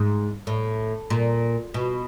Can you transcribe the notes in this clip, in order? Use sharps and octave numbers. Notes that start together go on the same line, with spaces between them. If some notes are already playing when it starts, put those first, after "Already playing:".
Already playing: G#2
A2
A#2
B2